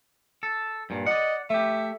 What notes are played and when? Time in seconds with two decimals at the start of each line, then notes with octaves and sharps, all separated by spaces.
0.43 A4
0.90 G2 A#2
1.06 D5 D#5 F#5
1.50 A3 G4 E5